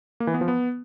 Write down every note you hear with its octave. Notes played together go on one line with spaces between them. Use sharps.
A#3
E3
B3
F3
B3